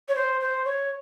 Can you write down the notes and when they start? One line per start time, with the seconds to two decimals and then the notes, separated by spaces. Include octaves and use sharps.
0.08 C#5
0.15 C5
0.41 C5
0.65 C#5